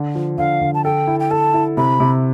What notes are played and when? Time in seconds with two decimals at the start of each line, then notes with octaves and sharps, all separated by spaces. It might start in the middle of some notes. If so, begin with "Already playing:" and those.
Already playing: D3
0.15 F3
0.38 D3 F5
0.61 D3
0.74 A5
0.84 A4 G5
1.07 E4
1.20 G5
1.31 A4 A5
1.54 E4
1.77 C3 B5
2.00 C3